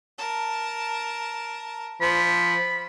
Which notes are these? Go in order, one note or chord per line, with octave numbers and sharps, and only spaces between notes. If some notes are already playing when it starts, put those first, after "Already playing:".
A#4 A5
F3 B5